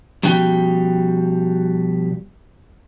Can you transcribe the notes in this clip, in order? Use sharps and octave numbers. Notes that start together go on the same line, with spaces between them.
B2 F3 G3 C#4 F#4 G5